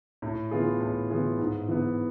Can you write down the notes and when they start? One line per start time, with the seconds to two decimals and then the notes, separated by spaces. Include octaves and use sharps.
0.22 A2
0.51 E3 B3 F4 G#4
0.80 A2
1.10 E3 B3 F4 G#4
1.39 G#2
1.68 E3 B3